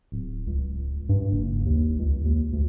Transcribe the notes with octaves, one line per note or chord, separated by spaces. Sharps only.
D1
C#2
G2
F#1
D#2
C#2
D#2
D2